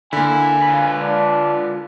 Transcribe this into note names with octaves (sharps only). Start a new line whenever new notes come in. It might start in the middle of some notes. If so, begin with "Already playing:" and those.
D3 A#3 E4 G#5
F4 B4
D4